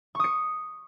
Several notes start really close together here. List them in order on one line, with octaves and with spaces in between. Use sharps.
C#6 D#6 C#7